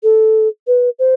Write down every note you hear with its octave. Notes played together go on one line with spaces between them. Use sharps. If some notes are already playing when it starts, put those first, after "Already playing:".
A4
B4
C5